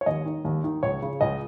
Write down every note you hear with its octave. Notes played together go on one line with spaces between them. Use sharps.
C#5
D#2 D#5
D#3
D#2
D#3
C#2 C#5
C#3
C#2 D#5